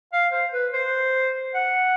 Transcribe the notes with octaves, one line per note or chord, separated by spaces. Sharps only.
F5
C5
B4
C5
F#5